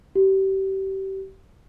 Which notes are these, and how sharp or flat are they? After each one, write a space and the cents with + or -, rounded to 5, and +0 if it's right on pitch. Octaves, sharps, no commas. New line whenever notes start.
G4 -30